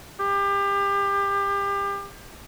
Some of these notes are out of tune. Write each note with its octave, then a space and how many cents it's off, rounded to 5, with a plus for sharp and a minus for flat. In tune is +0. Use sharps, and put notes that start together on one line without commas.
G4 +30